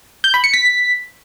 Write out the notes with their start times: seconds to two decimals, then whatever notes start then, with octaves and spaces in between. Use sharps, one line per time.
0.24 G6
0.34 B5
0.44 C#7
0.54 B6